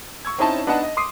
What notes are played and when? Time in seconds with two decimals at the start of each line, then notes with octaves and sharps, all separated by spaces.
0.25 C#6 E6 G#6
0.38 C4 C#4 D#4 E4 C#5 A5
0.67 B3 D4 D#4 D#5 F#5 A5
0.83 D#5
0.97 C6 D6 D#6 C7